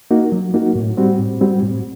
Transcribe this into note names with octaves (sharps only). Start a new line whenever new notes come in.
A#3 D#4 F#4
F#3
A#3 D#4 F#4
A2
G3 C4 F#4
A2
G3 C4 F#4
A2